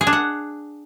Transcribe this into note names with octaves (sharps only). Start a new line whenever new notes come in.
G#4
D4
F#5